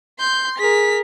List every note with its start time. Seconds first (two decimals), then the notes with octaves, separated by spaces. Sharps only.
0.20 C6 G6
0.58 G#4 A#4 B6